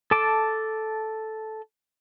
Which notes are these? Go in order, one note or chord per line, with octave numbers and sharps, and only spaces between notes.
A4 A5 D6